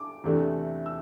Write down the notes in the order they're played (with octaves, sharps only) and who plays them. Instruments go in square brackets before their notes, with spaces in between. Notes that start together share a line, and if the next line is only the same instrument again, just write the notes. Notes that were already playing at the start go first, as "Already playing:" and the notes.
Already playing: [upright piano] D6
E2 C3 E3 A3 D4
E6